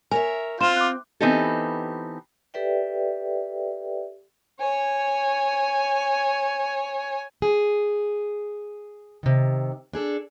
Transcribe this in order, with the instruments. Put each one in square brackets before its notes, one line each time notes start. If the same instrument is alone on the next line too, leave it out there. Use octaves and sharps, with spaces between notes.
[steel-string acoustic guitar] A#4 C#5 E5 [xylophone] G#5
[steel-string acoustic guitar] C4 [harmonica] F4 [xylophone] C6 E7
[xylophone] D6 F#6
[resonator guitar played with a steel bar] E3 B3 C4 D#4 G4 A4
[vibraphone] G4 A4 B4 D5 E5 G5
[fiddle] C#5 G#5
[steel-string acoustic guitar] G#4
C3 D#3
D4 G#4 A4